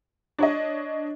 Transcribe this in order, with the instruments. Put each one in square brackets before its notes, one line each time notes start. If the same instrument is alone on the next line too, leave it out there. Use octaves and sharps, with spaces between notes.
[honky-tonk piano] D4 C#5 D#5